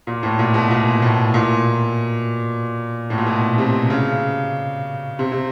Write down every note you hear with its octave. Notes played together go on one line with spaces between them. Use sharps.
A#2
A2
A#2
B2
A#2
A2
A#2
A2
A#2
B2
C3
C#3
C3
C3